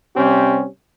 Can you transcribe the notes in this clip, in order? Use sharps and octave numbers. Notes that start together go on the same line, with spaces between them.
C3 G3 C4 C#4 G4